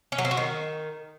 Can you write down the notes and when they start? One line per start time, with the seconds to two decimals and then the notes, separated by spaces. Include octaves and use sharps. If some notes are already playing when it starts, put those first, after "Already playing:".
0.12 C#4
0.18 F#3
0.25 C4
0.31 F#4
0.37 D#3